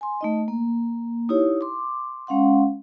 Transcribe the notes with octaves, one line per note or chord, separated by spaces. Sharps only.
G#5 C6
A3 D#4 D#5
A#3
D#4 E4 G4 C#5
C6 D6
G#3 C#4 F5 F#5 C6